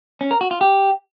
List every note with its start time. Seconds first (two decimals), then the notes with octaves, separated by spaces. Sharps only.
0.21 C#4
0.31 A#4
0.41 F#4
0.51 F4
0.61 G4